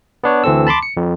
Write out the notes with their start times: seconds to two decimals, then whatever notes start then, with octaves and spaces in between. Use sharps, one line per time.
0.24 B3 D4 C#5
0.44 D2 E3 C4 A4 E6
0.67 A5 B5 C6 D6
0.83 C#7
0.97 F2